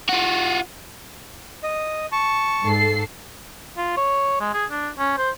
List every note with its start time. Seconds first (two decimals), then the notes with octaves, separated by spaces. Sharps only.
0.09 F4 F#4
1.64 D#5
2.12 A5 C#6
2.63 G#2 A4 C7
3.77 F4
3.97 C#5
4.41 G#3
4.54 G#4
4.71 D4
4.99 C#4
5.18 C5